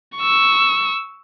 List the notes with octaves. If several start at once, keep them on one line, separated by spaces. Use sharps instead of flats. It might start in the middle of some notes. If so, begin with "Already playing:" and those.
C#6 E6